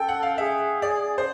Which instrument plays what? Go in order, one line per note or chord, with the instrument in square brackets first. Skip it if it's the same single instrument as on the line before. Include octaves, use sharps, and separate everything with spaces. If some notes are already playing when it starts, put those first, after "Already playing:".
Already playing: [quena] A4 [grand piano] G5
[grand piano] F#5
F5
[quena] G#4 [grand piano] E5
[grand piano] D5
C5